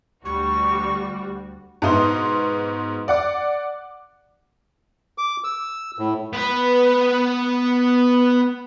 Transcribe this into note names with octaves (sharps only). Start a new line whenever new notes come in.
D2 G3 F#4 C#6
G#2 B2 D#5 C6
D5 F#5 D6
D6
E6
A2
B3 B4